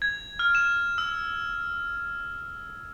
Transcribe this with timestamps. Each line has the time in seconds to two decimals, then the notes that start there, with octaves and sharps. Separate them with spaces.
0.02 G#6
0.39 F6
0.55 E7
0.98 E6